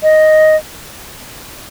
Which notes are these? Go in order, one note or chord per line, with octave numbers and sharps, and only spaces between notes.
D#5